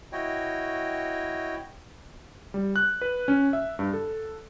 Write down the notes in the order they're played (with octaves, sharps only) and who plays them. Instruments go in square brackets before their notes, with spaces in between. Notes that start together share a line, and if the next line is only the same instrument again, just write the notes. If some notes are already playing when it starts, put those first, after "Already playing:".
[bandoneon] E4 F#4 C#5 D#5 G5
[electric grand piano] G3
F#6
B4
C#4
E5
G2
A4